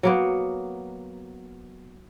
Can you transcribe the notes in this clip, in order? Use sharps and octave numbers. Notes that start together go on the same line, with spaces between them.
F#3 A#3 B3